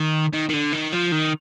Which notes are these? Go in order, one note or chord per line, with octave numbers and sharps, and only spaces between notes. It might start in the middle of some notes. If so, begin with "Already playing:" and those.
Already playing: D#3
D#3
D#3
D3
D#3
F3
D#3